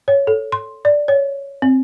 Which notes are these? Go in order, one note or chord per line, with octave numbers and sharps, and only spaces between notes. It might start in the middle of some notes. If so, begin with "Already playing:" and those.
C#5
A4
C6
D5
C#5
C4